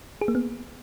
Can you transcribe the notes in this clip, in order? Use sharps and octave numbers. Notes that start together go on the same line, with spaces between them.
G#4
A#3
B3